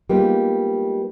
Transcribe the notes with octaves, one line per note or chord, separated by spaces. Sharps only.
G3 G#3 A#3 B3 D#4 F4